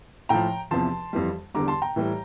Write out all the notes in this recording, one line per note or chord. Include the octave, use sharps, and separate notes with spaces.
A2 F3 G5 A#5
E2 C3 F3 A5 C6
F2 E3 G3
E2 D3 G3 A#5 D6
A5 C6
G5 A#5
A2 E3 G3